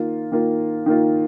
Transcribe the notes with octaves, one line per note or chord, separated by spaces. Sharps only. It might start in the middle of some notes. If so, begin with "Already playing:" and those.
Already playing: D#3 A#3 F4
D#3 A#3 F4
D#3 A#3 F4